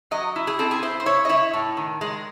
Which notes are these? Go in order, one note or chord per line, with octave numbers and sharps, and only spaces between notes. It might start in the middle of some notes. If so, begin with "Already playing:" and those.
F#3 D#5
E4
G#4
C4 A4
G#4
E4 C5
C5
E4 C#5
D#5
E4 C#5
A2
D#3
G#3